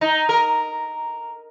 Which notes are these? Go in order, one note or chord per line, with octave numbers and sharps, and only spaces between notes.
D#4
A#4